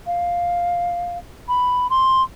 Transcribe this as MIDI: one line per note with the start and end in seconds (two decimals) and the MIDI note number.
0.07 1.18 77
1.48 1.90 83
1.90 2.23 84